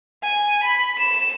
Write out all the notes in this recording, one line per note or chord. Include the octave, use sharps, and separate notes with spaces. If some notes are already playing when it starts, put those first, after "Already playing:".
G#5
B5
E7